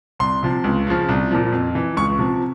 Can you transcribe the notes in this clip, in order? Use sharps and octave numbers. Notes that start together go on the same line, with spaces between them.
C2 C6
C3 F3
C#2
C#3 F3
C2
A#2 F3
F2
E3
C#2 C#6
C3 F3